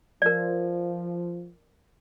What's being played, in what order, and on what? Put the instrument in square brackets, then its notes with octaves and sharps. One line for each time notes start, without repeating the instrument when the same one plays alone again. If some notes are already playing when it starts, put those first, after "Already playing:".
[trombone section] F3 [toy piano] A#4 D5